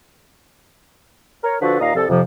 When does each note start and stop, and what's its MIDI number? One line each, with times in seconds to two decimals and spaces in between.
1.44 1.56 70
1.44 1.56 73
1.62 1.76 50
1.62 1.76 53
1.62 1.76 66
1.62 1.76 69
1.62 1.76 71
1.80 1.93 39
1.80 1.93 46
1.80 1.93 75
1.80 1.93 77
1.80 1.93 82
1.95 2.05 36
1.95 2.05 53
1.95 2.05 69
2.09 2.21 41
2.09 2.21 48
2.09 2.21 53